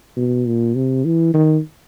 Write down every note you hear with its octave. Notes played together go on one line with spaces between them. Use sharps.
B2
A#2
C3
E3
D#3